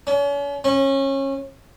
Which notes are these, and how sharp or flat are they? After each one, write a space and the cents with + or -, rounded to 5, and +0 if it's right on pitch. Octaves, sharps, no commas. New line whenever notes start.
C#4 +40
C#4 -25